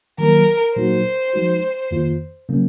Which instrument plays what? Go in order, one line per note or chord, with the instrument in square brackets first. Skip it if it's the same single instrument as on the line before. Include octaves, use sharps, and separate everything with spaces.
[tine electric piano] D#3 F#3 A#3 [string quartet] A#4
[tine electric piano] A#2 F#3 A#3 D#4 F#4 [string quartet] C5
[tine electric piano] F3 G#3 D#4 F#4
F2 D#3 A#3 F4
C#3 F#3 A#3 C#4